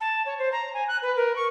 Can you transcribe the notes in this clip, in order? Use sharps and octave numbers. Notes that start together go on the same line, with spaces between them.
A5
C#5
C5
A#5
G#5
F#6
B4
A#4
C#6